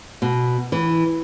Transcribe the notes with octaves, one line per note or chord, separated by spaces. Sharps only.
B2
E3